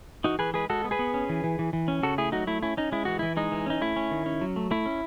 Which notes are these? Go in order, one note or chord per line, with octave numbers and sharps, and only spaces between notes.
E3 D#4 F#4
E3 G#4 B4
G#3 G#4 B4
G#3 F#4 A4
B3
G#4 B4
B3
C#4
E3
E3
E3
E3
C#4
C#3 F#4 A4
A3 E4 G#4
F#3 D#4 F#4
A3 E4
C#4 E4
C#4 D#4
G#3 E4
E3 F#4
E3 E4
G#3 D#4
E3
C#4 D#4
A3 E4
C#4
D#3
C#4
F#3
A3
A3 E4
C#4